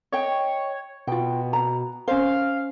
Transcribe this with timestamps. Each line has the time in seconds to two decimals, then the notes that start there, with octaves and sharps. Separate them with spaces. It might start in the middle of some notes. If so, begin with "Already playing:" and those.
0.12 C#5 D#5 G5
1.07 B2 F4 G5
1.53 A#5
2.08 C#4 C5 F5